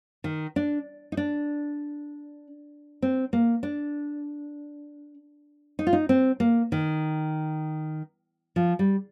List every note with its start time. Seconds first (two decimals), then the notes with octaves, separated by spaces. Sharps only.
0.24 D#3
0.56 D4
1.12 D#4
1.17 D4
3.02 C4
3.33 A#3
3.63 D4
5.79 D#4
5.87 F4
5.93 D#4
6.09 C4
6.40 A#3
6.72 D#3
8.56 F3
8.79 G3